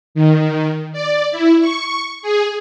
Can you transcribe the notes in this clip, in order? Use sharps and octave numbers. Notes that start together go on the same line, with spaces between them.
D#3
D5
E4
C#6
G#4